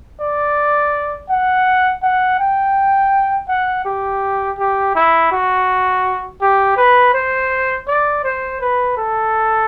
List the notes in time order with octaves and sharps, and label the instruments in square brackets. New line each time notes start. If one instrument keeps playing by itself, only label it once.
[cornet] D5
F#5
F#5
G5
F#5
G4
G4
E4
F#4
G4
B4
C5
D5
C5
B4
A4